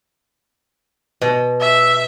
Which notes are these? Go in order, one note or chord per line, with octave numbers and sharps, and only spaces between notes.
B2
E5